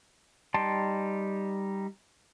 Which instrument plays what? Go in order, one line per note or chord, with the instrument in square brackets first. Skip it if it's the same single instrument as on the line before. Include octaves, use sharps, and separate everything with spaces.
[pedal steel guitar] G3 D#4 G5 A5 C6